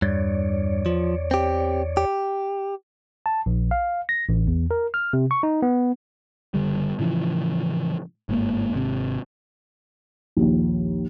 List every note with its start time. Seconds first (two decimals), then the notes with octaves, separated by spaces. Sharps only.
0.02 E2 G2 C#5 D5
0.86 F3
1.31 C4 G4
1.97 G4
3.26 A5
3.46 A#1
3.71 F5
4.09 A#6
4.29 A1
4.47 E2
4.71 A#4
4.94 F6
5.13 C3
5.31 C#6
5.43 D#4
5.62 B3
6.54 F#1 B1 D3 G3
6.99 A2 C#3 E3 F3
8.29 G1 G#2 A#3
8.74 G#1 C3
10.37 A#1 D#2